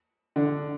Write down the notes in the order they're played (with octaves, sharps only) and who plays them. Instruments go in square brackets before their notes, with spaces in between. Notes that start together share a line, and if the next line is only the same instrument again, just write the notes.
[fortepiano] D3